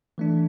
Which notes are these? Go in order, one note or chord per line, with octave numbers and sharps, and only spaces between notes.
E3 A3 D4